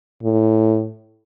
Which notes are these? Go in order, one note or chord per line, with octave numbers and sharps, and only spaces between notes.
A2